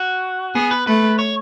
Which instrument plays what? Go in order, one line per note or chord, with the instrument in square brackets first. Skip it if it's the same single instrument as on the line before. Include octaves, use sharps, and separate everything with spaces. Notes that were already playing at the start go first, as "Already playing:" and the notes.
Already playing: [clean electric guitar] F#4
[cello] B3 [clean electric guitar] G#4
[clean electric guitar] B4
[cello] A3 [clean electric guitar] B4
[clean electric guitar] C#5